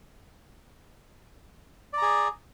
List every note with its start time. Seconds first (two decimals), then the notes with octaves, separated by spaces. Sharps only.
1.93 D5
1.98 A#5
2.02 G#4